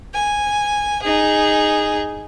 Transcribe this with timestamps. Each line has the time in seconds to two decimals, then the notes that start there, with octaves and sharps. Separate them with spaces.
0.14 G#5
1.02 D#4 G#4